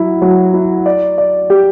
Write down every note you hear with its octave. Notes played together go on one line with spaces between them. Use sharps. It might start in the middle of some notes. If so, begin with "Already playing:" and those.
Already playing: F#3 E4
F#3
E4
D5
D5
G4